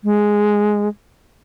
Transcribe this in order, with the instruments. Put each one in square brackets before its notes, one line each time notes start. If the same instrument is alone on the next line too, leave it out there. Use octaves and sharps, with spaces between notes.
[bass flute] G#3